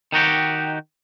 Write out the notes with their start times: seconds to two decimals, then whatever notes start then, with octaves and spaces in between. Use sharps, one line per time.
0.12 D#3 D#4 F#4 G4